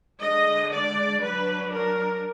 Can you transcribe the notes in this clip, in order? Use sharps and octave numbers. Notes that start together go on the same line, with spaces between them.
D3 G#3 D4 D#5
D5
F#3 D4 B4
A#4